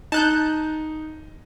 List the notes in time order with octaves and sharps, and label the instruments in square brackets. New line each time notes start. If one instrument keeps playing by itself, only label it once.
[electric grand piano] D#4 [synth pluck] A5 F#6 G6